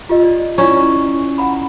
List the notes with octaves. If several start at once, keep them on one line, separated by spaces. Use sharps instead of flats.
F4 G4 D#5
D5
C#4 E4 D5 A#5
F#5 A#5 B5